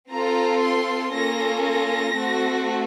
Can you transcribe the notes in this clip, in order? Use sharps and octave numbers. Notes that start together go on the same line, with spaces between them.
C4 F4 A4 A#5
C6
A#3 C#4 F4 A4 A#6
A#6
A3 C4 F#4 A4